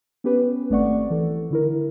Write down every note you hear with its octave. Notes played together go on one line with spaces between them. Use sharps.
B3 C#4 G4 B4
G#1 A3 C4 D5 F#5 C#6
E3 A4
D3 E4 A#4